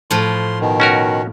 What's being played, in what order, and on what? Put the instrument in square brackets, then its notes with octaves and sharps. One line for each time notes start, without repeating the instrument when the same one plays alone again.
[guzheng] A2 F3 [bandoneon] C6
[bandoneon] B2 D#3
[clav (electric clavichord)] C#4 F#4 A#4